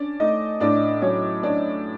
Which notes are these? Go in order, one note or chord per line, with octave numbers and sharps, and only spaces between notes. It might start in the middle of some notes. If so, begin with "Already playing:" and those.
Already playing: C#4 D4 D5
A3 D#4 D#5
A2 D4 D5
F#3 C#4 C#5
C#4 D4 D5